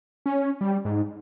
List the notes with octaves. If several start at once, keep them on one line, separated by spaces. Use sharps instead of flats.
C#4
G3
G#2